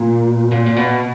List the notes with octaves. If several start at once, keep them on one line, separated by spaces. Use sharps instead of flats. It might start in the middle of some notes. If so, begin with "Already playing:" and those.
Already playing: A#2
A#2
A#2
B2